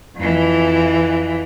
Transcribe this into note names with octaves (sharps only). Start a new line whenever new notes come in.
F2 E3